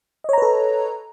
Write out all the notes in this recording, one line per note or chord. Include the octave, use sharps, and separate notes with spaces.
A4 B4 C#5 D#5 A#5